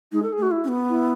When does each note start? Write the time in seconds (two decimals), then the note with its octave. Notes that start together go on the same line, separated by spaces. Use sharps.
0.12 G#3 D#4
0.22 A4
0.33 G#4
0.38 A3
0.42 F#4
0.51 E4
0.64 C#4
0.68 B3
0.89 E4